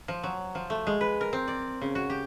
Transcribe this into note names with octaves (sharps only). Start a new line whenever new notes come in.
F3
F#3
F3
A3
G#3
B4
A#4
C4
D5
C#3
F#4
G4